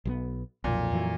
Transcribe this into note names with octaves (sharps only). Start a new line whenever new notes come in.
B1 F3 B3
B1 F2 A#2
F2 E3 F#3